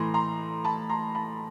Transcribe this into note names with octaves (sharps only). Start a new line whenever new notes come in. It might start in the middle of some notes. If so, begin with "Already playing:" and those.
Already playing: A2 E3 A#5 C6
A#5 C6
A5 B5
A#5 C6
A5 B5